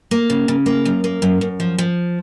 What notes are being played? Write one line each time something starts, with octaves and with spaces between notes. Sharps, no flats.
A#3
C#3
C#3
A#3
F#2
A#3
F#2
F#2
F3
F3